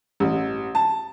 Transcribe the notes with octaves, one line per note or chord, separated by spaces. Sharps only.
A1
A5